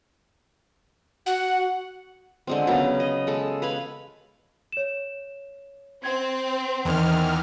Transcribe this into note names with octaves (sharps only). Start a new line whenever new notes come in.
F#4 F#5
D3 G#3 C4
C#3 F#3 B3 A#4
D#5
G#3 A4
B4 F5 G#5 B5
C#5 E7
C4 G#6
E2 D#3 F6